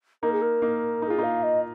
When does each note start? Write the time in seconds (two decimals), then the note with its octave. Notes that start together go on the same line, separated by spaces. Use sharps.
0.22 A#3 D#4 A#4
0.32 G#4
0.41 A#4
0.62 A#3 D#4
1.02 D#4 A#4
1.07 F4 G#4
1.18 A#3 D#4 F5
1.43 D#5